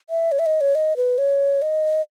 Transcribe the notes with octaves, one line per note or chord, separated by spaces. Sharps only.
E5
C#5
E5
D#5
C#5
D#5
B4
C#5
D#5